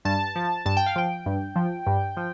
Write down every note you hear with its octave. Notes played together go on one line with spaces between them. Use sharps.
G2 A5
F3
G2 A5
G5
F5
F3 G5
G2
F3
G2
F3